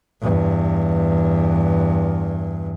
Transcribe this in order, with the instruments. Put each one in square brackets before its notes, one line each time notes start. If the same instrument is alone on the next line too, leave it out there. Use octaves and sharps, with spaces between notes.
[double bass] E2 G2